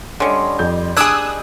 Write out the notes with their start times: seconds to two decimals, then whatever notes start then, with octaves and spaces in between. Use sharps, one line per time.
0.20 D3 G3 C#4 C#5 D#5 C6
0.59 F2 G6
0.97 D4 G#4 D#6 E6 F#6 G#6 D7